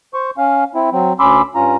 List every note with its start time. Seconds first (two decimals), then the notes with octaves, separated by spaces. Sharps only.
0.14 C5 C#6
0.38 C#4 F5
0.75 C4 E4
0.92 F#3 C4
1.20 D2 C#4 B5 C6 D6 E6
1.55 G2 C#4 F4 A#5